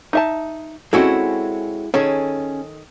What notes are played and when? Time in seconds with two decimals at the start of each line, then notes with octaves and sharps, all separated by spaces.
0.13 D#4 E5 A5
0.93 G#3 C4 C#4 E4 F#4 A4
1.94 D#3 C#4 G#4 A4